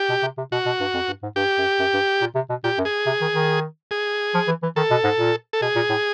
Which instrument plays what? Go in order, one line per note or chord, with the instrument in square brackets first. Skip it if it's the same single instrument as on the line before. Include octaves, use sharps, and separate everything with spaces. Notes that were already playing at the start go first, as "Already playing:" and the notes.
Already playing: [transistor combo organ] G4
[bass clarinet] B2
C3
C3
[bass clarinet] B2 [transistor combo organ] F#4
[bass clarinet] B2
G2
F2
G2
G#2
[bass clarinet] G2 [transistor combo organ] G4
[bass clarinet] F#2
F#2
G2
A#2
C3
B2
[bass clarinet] A#2 [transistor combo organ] G4
[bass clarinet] F#2
[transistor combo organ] G#4
[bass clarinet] C3
D#3
D#3
[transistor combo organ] G#4
[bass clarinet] F3
E3
E3
[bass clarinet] D#3 [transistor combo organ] A4
[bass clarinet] B2
G#2
A#2
[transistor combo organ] A4
[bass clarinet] B2 [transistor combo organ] G#4
[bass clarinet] A#2
A2